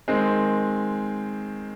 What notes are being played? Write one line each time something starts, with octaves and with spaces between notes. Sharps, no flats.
D#3 G#3 C4